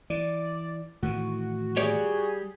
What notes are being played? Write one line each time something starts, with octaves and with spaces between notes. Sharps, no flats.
E3 D5
A2 D#3 E3 F#4
G3 G#4 C#5 D5